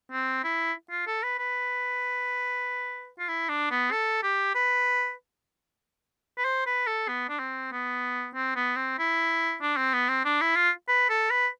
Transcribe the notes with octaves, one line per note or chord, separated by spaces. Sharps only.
C4
E4
F4
A4
B4
B4
F4
E4
D4
B3
A4
G4
B4
B4
C5
B4
A4
B3
D4
C4
B3
C4
B3
C4
E4
D4
C4
B3
C4
D4
E4
F4
B4
A4
B4